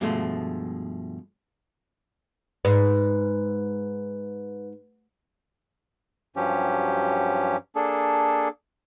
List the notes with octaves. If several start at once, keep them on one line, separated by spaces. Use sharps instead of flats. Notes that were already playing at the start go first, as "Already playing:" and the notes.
G2 B2 F3 G#3 A3
G#2 B4
G2 F3 F#3 C#4 G4
A#3 D4 G#4 A4